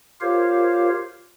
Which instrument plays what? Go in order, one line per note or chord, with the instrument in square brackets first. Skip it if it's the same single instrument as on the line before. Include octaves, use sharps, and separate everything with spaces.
[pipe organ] F4 G4 A#4 C5 C#5 F5